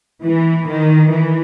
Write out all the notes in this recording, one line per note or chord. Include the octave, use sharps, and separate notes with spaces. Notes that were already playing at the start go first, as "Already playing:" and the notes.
E3
D#3
E3